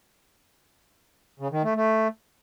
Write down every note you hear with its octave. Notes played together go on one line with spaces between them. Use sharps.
C#3
D#3
A3
A3